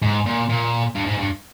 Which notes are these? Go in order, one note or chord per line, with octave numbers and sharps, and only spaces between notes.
G#2
A#2
A#2
G2
G#2
G2